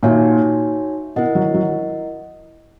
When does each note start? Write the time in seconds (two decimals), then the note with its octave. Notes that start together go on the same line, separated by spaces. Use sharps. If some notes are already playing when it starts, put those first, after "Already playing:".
0.03 A#2 D#4 F#4 C#5 E5 G#5
1.16 B2 E4 A#4 D#5 F#5
1.35 F#3
1.54 F#3